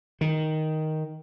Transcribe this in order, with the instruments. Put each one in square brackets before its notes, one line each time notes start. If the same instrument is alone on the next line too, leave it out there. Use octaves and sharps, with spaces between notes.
[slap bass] D#3